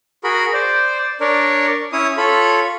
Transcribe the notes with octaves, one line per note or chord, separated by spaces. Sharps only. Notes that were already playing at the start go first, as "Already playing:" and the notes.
F#4 G#4 A#4 B5
C5 D5
D4 A#4 C#5 D5
C#4 E4 C#5 D#6
F4 A4 C#5 B5